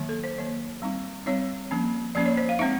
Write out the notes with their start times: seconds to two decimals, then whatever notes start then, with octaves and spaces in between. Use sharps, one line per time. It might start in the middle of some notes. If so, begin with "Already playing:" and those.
Already playing: D#3 F#3 A#3
0.09 A4
0.24 C5
0.38 D#3 F#3 A#3 C#5
0.82 G3 C4 D#4
1.26 G3 C4 D#4 C#5
1.71 F3 A#3 C#4
2.15 F3 A#3 C#4 D5
2.26 C#5
2.37 C5
2.49 F5
2.59 G#3 C4 D#4 E5